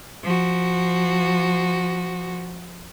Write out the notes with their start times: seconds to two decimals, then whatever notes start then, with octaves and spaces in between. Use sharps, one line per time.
0.23 F3 F#4